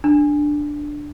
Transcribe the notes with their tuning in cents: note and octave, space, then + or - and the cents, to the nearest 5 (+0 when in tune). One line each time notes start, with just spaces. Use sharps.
D4 +5